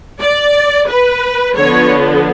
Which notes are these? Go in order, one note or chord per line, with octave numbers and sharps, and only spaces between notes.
D5
B4
D3 F3 B3 C#5